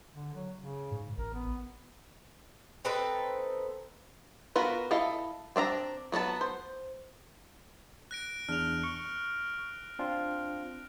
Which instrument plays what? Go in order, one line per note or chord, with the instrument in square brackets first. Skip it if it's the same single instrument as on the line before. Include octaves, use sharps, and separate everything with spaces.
[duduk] D3
F#3
C#3
[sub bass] G#2
[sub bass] A1 [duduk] A#4
[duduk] B3
[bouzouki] C4 D#4 A4 B4
[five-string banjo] B3 F4 F#4 A#4 B4
E4 A4 D#5 F5
C4 D4 E5 A#5
F#3 B3 F#5 A5
C5
[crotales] F#6 A#6 D7
[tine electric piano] E2 D4 [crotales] F6 F7
[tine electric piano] C#6
C4 D4 F4